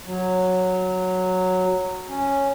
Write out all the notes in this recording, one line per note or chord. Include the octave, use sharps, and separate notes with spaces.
F#3
C#4